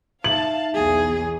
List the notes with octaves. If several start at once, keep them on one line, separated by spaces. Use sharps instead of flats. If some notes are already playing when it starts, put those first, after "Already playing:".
D#4 E5 F5 A5 F#7
B1 E2 E3 G#4